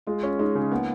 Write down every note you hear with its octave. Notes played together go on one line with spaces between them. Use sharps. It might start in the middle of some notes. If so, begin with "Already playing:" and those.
G#3 F4
C#4 F4
G#3 D#4
C#3 C#4
A#3 B3